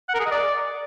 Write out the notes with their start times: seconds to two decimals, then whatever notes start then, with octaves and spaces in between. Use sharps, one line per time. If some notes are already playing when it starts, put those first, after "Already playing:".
0.09 F#5
0.14 A#4
0.20 G#4
0.26 D#5
0.31 D5